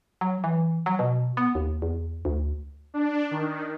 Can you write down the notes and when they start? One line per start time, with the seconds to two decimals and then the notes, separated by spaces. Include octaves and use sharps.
0.21 F#3
0.44 E3
0.86 F#3
0.99 B2
1.37 B3
1.55 D#2
1.82 E2
2.25 D2
2.94 D4
3.31 D#3